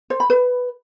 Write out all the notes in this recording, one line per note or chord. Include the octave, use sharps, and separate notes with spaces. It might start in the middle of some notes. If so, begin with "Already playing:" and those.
C5
B5
B4